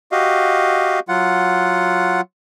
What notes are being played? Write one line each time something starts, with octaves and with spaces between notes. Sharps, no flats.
F#4 G4 D#5 F5
F#3 F4 F#5